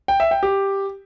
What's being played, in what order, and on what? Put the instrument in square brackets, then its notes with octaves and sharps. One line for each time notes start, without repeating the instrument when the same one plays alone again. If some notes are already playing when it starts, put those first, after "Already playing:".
[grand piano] G5
E5
G5
G4